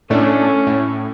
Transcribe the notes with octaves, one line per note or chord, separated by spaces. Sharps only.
A2 A3 C#4 D4
A2